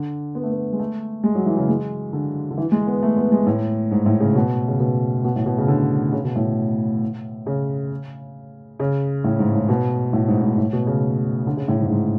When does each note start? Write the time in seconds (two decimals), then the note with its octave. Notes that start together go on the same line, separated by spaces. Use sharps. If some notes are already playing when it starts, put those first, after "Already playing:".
Already playing: D3
0.35 B3
0.43 A3
0.51 B3
0.73 G#3
0.79 A3
1.24 G#3
1.35 F#3
1.46 E3
1.57 C#3
1.69 G#3
2.13 D3
2.51 D3
2.58 E3
2.72 G#3
2.87 B3
3.03 A3
3.17 B3
3.32 G#3
3.47 A2
3.91 G#2
4.06 A2
4.20 C#3
4.35 B2
4.68 C#3
4.80 B2
5.24 B2
5.36 A2
5.46 B2
5.58 C#3
5.68 D3
6.12 C#3
6.24 B2
6.36 A2
7.47 C#3
8.80 C#3
9.24 A2
9.39 G#2
9.53 A2
9.69 B2
10.13 A2
10.28 G#2
10.42 G#2
10.58 A2
10.73 B2
10.87 C#3
11.47 D3
11.57 C#3
11.68 A2
11.80 G#2
11.86 A2
11.90 G#2